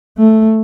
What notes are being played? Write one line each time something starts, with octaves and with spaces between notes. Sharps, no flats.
A3